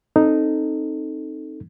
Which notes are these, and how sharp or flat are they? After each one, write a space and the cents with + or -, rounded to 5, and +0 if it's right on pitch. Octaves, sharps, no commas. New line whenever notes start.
C4 +20 D#4 -5 A4 +0